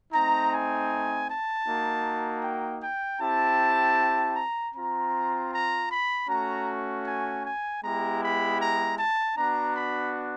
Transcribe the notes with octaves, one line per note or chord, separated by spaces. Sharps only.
A3 C4 D#4 A#5
G#5
A5
A#3 D#4 F#4
G5
G5
C4 E4 G4 A5
A#5
C4 F4 A#5
A#5
B5
A3 C#4 F#4 A#5
G#5
G#5
G#3 B3 E4 G4 A#5
B5
A#5
A5
B3 D4 F#4 A#5
B5